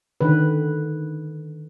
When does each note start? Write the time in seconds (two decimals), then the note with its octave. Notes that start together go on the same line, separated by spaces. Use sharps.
0.21 D3 D#3 B4